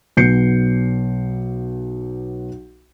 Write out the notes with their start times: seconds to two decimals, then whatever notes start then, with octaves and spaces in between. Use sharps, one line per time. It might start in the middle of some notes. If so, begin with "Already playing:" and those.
0.17 B1 B3 G6 C7 C#7